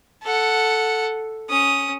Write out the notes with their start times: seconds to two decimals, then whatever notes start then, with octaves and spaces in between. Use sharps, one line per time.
0.23 A4 F#5
1.49 C#4 D#6